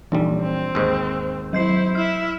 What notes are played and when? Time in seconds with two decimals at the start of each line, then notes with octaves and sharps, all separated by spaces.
0.12 A#1 E3 G3 D#4
0.41 C4
0.75 D#2 G#2 E6
1.53 F#3 E4 C5 G6 C7
1.95 E4 E5 F6